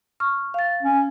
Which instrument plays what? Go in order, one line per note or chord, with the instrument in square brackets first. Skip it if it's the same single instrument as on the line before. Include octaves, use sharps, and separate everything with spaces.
[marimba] C#6 F6
F5 A6
[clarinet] C#4